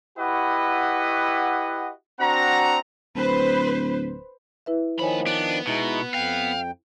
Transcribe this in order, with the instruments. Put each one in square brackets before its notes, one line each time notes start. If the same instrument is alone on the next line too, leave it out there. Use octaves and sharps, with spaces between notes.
[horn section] E4 F#4 G4 B4 D#5 F#5
C4 D4 F#4 F#5 A#5
[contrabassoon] D1 [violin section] B4 C5
[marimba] E4 B4 E5
[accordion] D#3 F3 [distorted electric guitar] A#3 B5 [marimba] C5 C#5 G#5
[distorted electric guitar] B3 [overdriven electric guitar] D4
[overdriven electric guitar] B2 [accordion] G#3 D#4 E4
[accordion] F2 G5 [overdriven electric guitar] F5